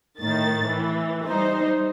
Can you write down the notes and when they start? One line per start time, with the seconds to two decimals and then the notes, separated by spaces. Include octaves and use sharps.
0.20 A2 D#3 A6
0.66 E3
1.26 G3 D#4 C5